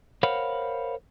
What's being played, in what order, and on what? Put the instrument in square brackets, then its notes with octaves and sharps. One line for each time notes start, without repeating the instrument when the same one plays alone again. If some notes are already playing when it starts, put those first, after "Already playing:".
[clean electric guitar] A#4 C5 C#5 F5 F#5 B5